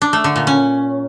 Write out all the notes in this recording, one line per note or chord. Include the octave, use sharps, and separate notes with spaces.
D4
A3
D3
A#2
C#4